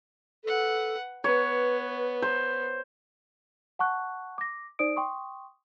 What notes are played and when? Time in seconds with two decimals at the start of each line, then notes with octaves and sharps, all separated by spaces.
0.44 A4 B4 F#5
1.24 B3 B4 C#5
2.22 C5
3.79 F#5 A5 C#6 F#6
4.38 D6 A#6
4.79 D#4 C5 D5 D#6 D7
4.96 G5 C6 C#6 D#6